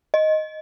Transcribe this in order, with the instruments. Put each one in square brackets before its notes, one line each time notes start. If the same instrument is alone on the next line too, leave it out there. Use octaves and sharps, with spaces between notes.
[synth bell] D#5